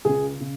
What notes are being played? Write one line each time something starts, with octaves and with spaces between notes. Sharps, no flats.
C#2 C#3 G#4
C#3